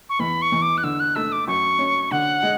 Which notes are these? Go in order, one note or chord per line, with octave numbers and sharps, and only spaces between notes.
C#6
E2 B5
C#6
E2
D6
F#6
D3 E6
F#6
A3 E6
D6
F#2 C#6
C#4
D3 F#5
G#3